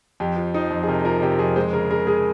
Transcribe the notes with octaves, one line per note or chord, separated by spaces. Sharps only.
F2 G4
F3
F3 D#4
F2
G#4
C3 A#4
F3 A#4
C3 G4
F2 G#4
G#3 C5
C#3 A#4
C#3 A#4
G#3 G#4